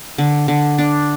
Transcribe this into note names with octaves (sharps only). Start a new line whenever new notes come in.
D3
D3
D4